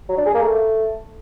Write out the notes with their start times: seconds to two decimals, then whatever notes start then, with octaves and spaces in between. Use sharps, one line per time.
0.09 F#3
0.17 D4
0.26 G#4
0.34 A#3
0.42 A3